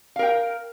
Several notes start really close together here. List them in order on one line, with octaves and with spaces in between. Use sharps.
F5 A#4 G5